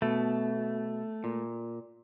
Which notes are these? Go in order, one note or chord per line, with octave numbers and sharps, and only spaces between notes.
B2 A3
A#2